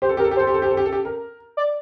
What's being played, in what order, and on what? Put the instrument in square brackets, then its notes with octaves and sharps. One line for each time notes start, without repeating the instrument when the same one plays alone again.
[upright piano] G4 [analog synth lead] C5
[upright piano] A4
[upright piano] G4 [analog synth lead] A#4
[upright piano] A4
G4
[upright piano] A4 [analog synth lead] C5
[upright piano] G4
A4
G4
A4
G4
A4
G4
A#4
[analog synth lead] D5